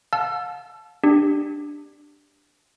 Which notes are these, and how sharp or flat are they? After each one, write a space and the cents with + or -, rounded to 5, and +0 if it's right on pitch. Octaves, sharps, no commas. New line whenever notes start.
F5 +40 A5 -20 E6 +30
D4 +5 G4 +0